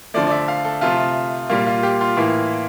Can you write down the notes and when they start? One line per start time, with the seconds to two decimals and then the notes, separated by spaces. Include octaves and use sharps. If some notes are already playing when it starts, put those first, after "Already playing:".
0.14 D3 F3 A3 D5
0.27 D5
0.31 E5
0.48 F5
0.65 A4
0.81 C3 F3 A3 F4
1.49 A#2 G3 A#3 F4
1.67 F4
1.83 G4
2.01 F4
2.17 A2 E3 A#3